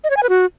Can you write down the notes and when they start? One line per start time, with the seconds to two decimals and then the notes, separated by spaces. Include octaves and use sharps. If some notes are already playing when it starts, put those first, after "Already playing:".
0.04 D#5
0.10 C#5
0.16 G#5
0.23 B4
0.29 F#4